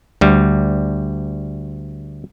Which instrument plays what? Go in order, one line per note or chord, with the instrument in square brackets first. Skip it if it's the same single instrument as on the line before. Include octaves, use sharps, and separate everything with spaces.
[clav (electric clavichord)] D2 G3